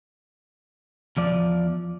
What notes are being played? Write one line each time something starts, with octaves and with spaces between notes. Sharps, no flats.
E2 F3 D5